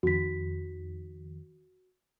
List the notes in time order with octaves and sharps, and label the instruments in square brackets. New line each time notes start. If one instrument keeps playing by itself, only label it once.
[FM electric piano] F2 D#3 [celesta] F#4 B6